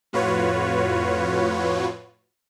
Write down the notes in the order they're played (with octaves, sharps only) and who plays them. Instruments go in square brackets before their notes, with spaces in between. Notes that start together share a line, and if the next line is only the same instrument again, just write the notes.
[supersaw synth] F2 A2 F4 F#4 B4 C#5